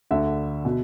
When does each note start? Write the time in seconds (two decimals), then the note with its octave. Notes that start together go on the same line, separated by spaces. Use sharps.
0.11 D2 D3 E5
0.65 B2